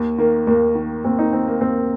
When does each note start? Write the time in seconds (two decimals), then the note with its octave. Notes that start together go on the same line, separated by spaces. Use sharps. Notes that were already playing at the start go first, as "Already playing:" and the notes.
Already playing: D#2
0.18 D#3 A#3
0.47 D#2 A#3
0.75 D#3
1.04 D#2 C4
1.19 D#4
1.33 D#3 C4
1.47 A#3
1.61 D#2 C4